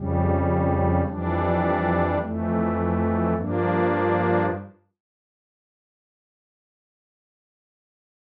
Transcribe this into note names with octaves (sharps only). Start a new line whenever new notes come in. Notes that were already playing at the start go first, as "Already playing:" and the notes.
Already playing: F2 C#3 G3
F2 E3 G3 D4
F2 E3 A3
G2 F3 A#3 D4